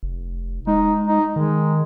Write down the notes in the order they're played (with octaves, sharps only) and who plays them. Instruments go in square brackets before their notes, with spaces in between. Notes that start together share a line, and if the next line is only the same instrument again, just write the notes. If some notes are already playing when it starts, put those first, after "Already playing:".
[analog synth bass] F1
[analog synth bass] G#3 [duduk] D#4
[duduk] D#4
[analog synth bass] D#3 [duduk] G#3